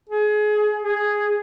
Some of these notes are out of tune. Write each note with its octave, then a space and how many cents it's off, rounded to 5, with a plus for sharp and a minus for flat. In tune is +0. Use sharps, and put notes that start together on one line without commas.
G#4 +25
G#4 +0